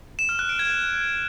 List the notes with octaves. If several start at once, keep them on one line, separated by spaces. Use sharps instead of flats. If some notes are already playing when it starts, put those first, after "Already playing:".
E7
F6
F#6
D7
G#6